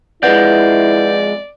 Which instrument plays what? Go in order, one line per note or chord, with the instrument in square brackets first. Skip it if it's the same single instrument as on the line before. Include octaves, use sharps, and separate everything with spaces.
[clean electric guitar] F2 G#3 [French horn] E4 [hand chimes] B4 F#5 G6 [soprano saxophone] D5